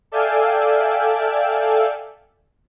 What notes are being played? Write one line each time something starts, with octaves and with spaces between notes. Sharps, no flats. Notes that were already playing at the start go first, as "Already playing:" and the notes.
A4 D5 E5 F5 G5 G#5